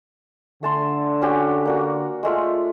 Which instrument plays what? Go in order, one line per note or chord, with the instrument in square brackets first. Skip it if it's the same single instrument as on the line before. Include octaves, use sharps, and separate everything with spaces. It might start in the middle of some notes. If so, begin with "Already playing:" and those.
[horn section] D3 [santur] A3 A5 C6
[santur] C#4 F#4 G4
A#3 D4 F#4
G#3 A3 F4